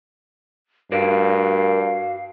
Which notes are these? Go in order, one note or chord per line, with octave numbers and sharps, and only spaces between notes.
G2 F#4 A#4 C5 D5 F5